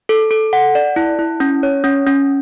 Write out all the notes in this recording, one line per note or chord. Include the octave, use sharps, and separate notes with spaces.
A4
A4
F#5
D5
E4
E4
C#4
C#5
C#4
C#4